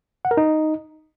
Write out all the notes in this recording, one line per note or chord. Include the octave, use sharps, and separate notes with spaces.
F#5
A#4
D#4